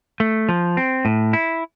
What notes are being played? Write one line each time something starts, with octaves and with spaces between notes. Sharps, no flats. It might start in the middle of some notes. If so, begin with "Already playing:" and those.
A3
F3
C4
A2
E4